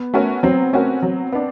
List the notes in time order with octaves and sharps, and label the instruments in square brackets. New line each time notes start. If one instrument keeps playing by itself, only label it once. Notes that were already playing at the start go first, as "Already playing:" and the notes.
Already playing: [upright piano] B3
[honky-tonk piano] A3 C#4 F#4 A#4
[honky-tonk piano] F#3 [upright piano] C4
[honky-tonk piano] A3 C#4 F#4 A#4
F#3
B3 D4